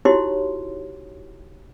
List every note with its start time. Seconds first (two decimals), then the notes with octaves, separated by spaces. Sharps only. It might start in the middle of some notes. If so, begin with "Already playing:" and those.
0.05 D#4 E4 F#4 G4 C#5 C6